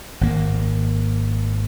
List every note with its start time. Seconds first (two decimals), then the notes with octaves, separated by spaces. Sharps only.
0.21 G#1 A#3